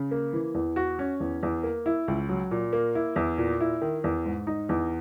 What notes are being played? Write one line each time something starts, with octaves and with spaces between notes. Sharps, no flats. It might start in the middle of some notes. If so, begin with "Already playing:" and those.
Already playing: C#3
A#3
E3
E2
F#4
C#4
E2
E2
A#3
E4
C#2
F#3
A#2
A#3
E4
E2
A#2
E4
D#3
E2
G#2
D#4
E2